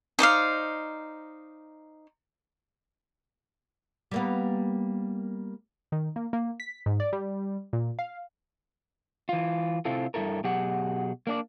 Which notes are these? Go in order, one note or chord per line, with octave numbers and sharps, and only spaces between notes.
D#4 C5 D5 F5
G3 A#3 B3
D#3
A#3
A#3
B6
G#2
D5
G3
A#2
F5
E3 F4
C3 C4 E4 F4 A4
G2 C#3 E4 A4 A#4
B2 F#3 G4 G#4 F#5
A#3 D4 D5